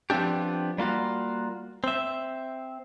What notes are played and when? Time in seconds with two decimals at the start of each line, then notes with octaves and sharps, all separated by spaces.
0.10 F3 B3 C4 D4 G4
0.78 G3 A#3 F4 F#4
1.84 C4 E5